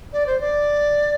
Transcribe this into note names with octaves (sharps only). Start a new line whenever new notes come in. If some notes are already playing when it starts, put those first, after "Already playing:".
D5
C5
D5